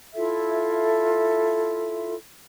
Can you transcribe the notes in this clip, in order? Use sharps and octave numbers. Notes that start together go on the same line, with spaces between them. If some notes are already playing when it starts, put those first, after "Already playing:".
E4 F4 A4 E5